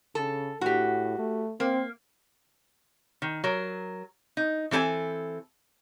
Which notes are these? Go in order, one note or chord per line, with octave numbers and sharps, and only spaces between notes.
C#3 A4
A2 F#4 G4
A3
A#3 C4
D#3
F#3 A#4
D#4
E3 C4 A4 B4 G#5